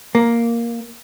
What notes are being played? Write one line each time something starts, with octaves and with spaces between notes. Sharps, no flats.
A#3